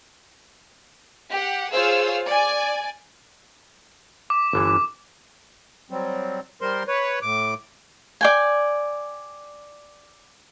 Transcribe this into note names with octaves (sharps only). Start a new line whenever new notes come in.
G4 F#5
F4 G#4 C5 C#5 F5 E6
D5 G#5
D6
G1 D3 E3
F#3 G3 C4
G3 A#4 C5 C6
B4 C#5
A2 D6
D5 G5 G#5